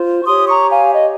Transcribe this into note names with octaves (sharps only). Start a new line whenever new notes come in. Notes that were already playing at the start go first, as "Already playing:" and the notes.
Already playing: F4 C5
C#6
G4 C#5 C6 D#6
A#5 C#6
F5 G#5
D#5